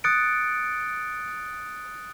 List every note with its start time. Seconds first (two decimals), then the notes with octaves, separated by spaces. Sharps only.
0.04 D#6 F#6 A6 C#7 D7